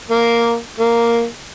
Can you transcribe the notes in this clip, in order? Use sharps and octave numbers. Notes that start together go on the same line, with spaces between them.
A#3
A#3